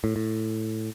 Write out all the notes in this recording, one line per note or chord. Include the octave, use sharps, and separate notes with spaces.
A2
A2